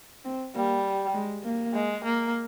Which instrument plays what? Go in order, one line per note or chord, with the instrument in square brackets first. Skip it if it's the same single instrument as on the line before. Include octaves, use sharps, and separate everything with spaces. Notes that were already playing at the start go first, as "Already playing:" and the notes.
[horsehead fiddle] C4
[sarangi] G3 [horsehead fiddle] A#3
[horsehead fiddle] G#3
A#3
[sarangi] G#3
A#3